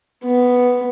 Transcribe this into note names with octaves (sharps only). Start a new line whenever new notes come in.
B3